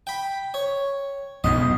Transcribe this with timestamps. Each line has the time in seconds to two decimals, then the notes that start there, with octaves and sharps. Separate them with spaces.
0.07 G5 B5
0.54 C#5
1.44 B1 F2 G#2 D#5